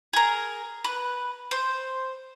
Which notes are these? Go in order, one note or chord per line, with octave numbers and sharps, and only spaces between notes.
G#4 A#4
B4
C5